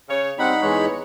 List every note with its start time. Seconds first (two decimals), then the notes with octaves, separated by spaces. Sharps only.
0.09 C#3 C#5
0.39 G2 G3 C4 D#4 F#5 B5
0.62 E2 E3 G#3 C#5